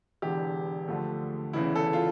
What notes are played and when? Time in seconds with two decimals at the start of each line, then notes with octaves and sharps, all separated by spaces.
0.22 E1 E2 D3 G4
0.88 D2 D3 F3 A3
1.53 E1 E2 C#3 E3 E4
1.76 A4
1.93 F4